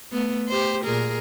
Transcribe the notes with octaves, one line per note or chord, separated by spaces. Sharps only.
A3 B3
G4 C5
A#2 G#4 A#4